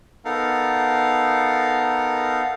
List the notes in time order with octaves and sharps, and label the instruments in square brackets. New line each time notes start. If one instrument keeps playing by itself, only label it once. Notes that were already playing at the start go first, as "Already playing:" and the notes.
[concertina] B3 D#4 A4 A#4 F5